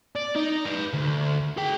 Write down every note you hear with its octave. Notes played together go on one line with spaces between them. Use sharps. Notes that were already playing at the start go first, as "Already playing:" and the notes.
D5
D#4
B4 D5
D2
G#4 G5